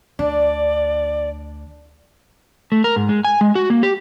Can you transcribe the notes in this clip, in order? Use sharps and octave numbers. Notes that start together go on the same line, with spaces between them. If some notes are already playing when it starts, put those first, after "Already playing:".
D2 D4 D5
A3
A#4
G#2
G#3
G#5
G#3
F#4
A#3
G4